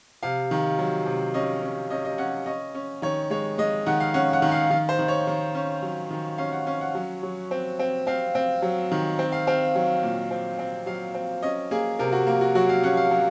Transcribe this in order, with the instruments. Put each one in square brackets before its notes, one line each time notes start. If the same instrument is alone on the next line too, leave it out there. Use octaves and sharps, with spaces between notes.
[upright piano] C3 F5
D#3
F#3
C3
C#4 D#5
C#4
C#4 D#5
D#5
C#4 F#5
C#4 D#5
C#4
D#3 C#5
G#3 C#5
G#3 D#5
D#3 F#5
F5
C#4 F#5
F#5
D#3
F5
D#3 F5
C5
D#3
C#5
D#3
C#4
F#3
D#3
C#4 F5
F#5
C#4 F5
F#5
F#3
F#3
C4
C4
C4 F5
C4
F#3
D#3
C4
F5
C4 F5
F#3
A#2
C4
C4
F#3 F5
C4
C#4 D#5
A#3 G#4
C3 A#4
F#4
A#3
F#4
F#3 F#4
F5
C#4 F#5
F5
F#3